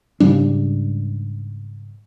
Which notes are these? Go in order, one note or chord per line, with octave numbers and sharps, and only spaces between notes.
G#2 C#3 G3 D4